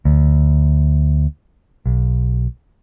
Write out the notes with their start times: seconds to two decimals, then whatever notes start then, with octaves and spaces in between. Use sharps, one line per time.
0.05 D2
1.86 B1